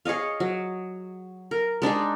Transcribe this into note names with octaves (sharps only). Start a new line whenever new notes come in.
G#4 C#5 D#5 F5
F#3
A#4
G#3 D4 D#4 G#4